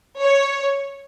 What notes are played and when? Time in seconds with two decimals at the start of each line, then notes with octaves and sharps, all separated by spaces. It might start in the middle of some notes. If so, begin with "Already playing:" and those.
0.20 C#5